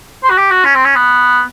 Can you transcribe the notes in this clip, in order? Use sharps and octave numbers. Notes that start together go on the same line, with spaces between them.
C5
F#4
G4
F#4
C#4
C4
C#4
B3